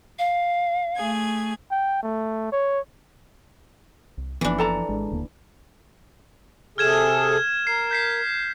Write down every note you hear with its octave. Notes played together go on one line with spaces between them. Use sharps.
F5
A3 G#4 G#6
G5
A3
C#5
C2
F#1 E3 F3 A#3 B3 D4
A4 A5 A#5
G#1 G#3
D#1 D2 A#3
C3 G#4 A4 F6 G#6 E7
A#4 C7
G6 B6 C7